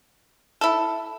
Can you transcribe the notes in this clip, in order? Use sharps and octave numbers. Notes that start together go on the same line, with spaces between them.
E4 A4